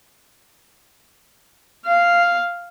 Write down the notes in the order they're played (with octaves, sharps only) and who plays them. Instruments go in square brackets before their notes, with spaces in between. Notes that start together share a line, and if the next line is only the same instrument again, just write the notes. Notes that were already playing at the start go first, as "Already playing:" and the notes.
[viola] F5